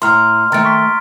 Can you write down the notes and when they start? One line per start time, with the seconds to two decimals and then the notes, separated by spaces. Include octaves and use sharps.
0.02 A2 A#5 C6 F6
0.52 D#3 A3 A#5 A6 D7
0.64 C6 C#6 B6